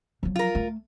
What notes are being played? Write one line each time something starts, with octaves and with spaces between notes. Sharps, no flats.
F3 F#3
F4 A#4
A3